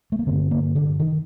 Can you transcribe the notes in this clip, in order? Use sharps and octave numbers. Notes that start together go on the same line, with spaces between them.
A3
A#3
G2 D3 C4
A#3
D3
D#3